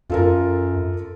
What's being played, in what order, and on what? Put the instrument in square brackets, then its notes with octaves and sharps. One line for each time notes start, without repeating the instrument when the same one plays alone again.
[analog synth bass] F#2 [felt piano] F4 A4 A#4